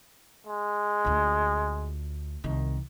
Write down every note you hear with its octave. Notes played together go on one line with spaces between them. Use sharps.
G#3
D2 F4
C2 D#3